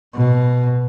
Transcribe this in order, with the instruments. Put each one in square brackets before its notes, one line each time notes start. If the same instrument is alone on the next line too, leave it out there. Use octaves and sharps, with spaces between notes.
[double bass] B2